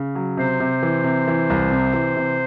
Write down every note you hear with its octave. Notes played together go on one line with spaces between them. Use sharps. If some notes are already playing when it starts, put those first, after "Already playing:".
Already playing: C#3
F#3
C3 C5
C3
E3
C3
E3
C2
C3
E3
C3